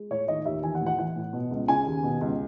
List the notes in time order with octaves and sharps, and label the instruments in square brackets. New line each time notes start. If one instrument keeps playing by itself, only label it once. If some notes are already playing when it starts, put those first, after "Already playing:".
Already playing: [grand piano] G#3
A2 C#5
D#3 D#5
D#2 E5
E3 G#5
F#5
A2
F#5
E3 F#5
A2
B2
C#2
C#3 G#5
D#2
B2
C#2